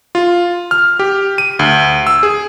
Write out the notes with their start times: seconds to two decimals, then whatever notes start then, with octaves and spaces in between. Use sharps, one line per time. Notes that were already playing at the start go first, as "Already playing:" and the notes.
0.15 F4
0.71 F6
0.99 G4
1.38 D#7
1.59 D2
2.07 E6
2.23 G#4